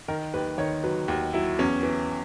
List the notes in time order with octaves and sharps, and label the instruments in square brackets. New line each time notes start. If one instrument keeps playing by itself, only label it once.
[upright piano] D#3 A#4
D#2 B4
D#3 C#5
F#3 B4
D#2 F#4
F#3 E4
E2 C#4
E3